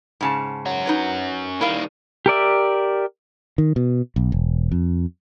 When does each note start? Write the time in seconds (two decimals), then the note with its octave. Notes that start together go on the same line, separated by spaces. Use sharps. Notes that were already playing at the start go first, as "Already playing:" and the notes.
0.21 G#2 C#3 A5
0.66 C#4 F#4
0.86 D#4 B4 C#5
1.61 D#3 G3 E4 A#4 F5
2.26 G4 A#4 D5 E5
3.58 D#3
3.76 B2
4.16 B1
4.32 E1
4.72 F2